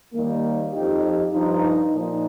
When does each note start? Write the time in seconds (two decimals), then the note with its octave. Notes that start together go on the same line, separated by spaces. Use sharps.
0.13 D#2 D#3 G3 A#3
0.73 F2 F3 D#4 G4
1.32 G2 F3 D#4
1.92 A#2 F3 D#4